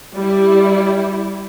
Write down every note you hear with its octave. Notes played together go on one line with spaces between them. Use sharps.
G3 E4